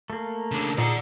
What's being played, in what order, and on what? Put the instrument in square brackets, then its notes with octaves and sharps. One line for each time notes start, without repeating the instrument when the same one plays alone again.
[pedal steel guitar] A3 A#3
[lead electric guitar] C#3 D4
[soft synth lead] A#2 [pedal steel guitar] D#4 G#4 [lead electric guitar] D5 F#5